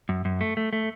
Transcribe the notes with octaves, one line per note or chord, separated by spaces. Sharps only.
F#2
F#2
A3
A3
A3